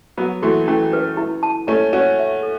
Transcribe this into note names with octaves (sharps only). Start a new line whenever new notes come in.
F#3 B3 F#5
E3 A3 F#4
E3 A3 C#4
B4
E4
A5
A3 C#4 E4
C#4 F#4 C#5
E5
A4